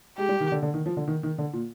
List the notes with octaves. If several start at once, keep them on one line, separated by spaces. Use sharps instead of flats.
G#3 G4
G3
D#3
D3
D3
D#3
F3
D3
D#3
D#3
D3
A#2